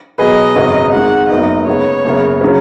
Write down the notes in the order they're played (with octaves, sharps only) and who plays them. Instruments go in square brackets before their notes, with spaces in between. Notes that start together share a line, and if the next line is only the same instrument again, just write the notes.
[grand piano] B2 F#3 B3 G#4 B4 [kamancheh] D#5
[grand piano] G#1 F#2 C#3 F#3 B3
[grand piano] G#1 G#2 G#3 [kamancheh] F#5
[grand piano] F#1 F#2 F#3 B3 D#4 [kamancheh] D#5
[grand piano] C#3 G#3 B3 [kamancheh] C#5
[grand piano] F#1 F#2 C#3 B3
C#3 F#3 C#4